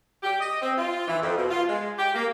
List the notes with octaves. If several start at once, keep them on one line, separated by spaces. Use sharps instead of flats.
G4
D#5
C4
F4
E3
F2
B2
F4
G#3
G4
A#3